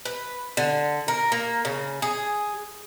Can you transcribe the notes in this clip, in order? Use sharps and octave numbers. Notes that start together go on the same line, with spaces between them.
B4
D3
A#4
A#3
C#3
G#4